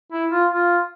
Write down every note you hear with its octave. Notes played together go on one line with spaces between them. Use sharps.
E4
F4
F4